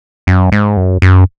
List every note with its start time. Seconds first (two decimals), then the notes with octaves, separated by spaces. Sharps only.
0.27 F#2
0.52 G#2
0.77 F#2
1.02 F#2